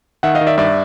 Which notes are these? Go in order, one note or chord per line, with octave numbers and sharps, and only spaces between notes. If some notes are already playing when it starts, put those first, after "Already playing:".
D#3 E5 F#5
D#5 F5
D#3
D5 E5
G2 D5 E5